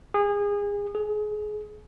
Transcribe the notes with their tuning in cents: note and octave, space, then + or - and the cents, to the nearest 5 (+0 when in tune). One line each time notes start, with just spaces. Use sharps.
G#4 -30
G#4 +25